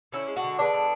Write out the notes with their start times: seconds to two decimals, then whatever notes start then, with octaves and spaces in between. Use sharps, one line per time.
0.12 D3 C#4 E4
0.28 G#3
0.36 D4 F#4
0.44 D3
0.59 G#3 B3 D4
0.73 D3